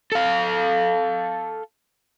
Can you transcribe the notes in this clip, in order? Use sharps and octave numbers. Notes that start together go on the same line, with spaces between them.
A4 F5